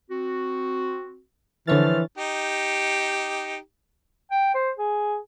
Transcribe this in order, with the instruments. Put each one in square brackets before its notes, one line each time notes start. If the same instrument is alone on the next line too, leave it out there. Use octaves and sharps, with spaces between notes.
[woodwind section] C4 F#4
[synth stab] D3 C#5 A6 [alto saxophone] E3 [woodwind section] F3 F6
[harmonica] D#4 G4
[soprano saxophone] G5
C5
G#4